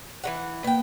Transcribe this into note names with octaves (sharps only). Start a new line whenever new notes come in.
E3 F#3 F#5
A#3 B3 G5